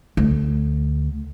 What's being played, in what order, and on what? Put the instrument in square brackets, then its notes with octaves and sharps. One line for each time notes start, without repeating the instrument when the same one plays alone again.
[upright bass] D2